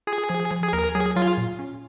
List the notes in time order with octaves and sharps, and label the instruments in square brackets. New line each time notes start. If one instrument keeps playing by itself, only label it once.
[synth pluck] F4 [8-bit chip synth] G#4
[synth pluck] F3
F3
[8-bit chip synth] G#4
[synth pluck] D#2 [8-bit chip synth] A#4
[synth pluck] F#3 [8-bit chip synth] G#4
[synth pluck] F#3 [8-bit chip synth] F4
[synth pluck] A#2
C#4